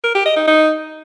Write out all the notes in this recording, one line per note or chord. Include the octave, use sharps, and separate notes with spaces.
A#4
G4
D#5
D#4
D#4